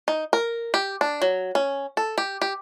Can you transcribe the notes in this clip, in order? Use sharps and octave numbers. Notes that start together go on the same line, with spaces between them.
D#4
A#4
G4
D4
F#3
C#4
A4
G4
G4